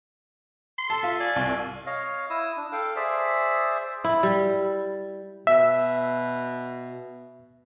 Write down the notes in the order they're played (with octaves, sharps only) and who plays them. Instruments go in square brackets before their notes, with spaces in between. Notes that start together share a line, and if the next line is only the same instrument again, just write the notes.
[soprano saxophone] C6
[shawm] A4 [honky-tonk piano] A5
[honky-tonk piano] F4 [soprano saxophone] E5
[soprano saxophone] D5 [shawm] G#5
[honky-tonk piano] C2
[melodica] C#5 D#5 F5
E4 D#6 E6
D4
A4 F5 G5
G#4 C5 D5 E5
[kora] E4
G3
[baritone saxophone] B2 [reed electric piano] E5